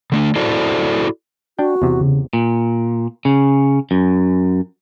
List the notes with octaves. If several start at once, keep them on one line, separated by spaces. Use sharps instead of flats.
D3 A3 D4
E4 F#4 A4 C5 D5
D4 F#4 G5
E2 C3
C#3
A#2
C#3
F#2